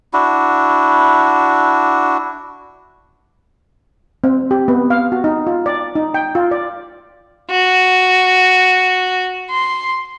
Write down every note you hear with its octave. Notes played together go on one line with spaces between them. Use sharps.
D4 E4 F#4
C4
G4
B3
F5
F#4
D#4
F4
D5
D#4
G5
F4
D5
F#4
C6